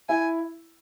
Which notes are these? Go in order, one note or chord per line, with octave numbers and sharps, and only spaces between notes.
E4 G#5